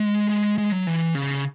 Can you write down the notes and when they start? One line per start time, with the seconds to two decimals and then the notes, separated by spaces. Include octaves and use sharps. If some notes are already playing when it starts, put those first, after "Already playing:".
Already playing: G#3
0.29 G#3
0.58 G#3
0.72 F#3
0.87 E3
1.15 C#3